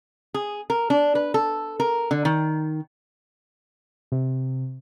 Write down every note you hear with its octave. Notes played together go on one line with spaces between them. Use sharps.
G#4
A#4
D4
B4
A4
A#4
D3
D#3
C3